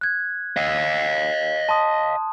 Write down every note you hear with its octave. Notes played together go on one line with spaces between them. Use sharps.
F#6 G#6
D#5 F5
A5 C6 D#6